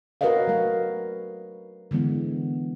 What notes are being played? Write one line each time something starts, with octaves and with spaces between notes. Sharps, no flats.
F#4 A#4 B4 C#5 D#5 F5
F#3 A3 F5
D3 E3 G#3 B3